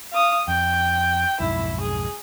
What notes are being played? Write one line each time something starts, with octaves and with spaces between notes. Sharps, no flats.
F5 D#6
F2 G5
B1 F2 G#2 E4
G#4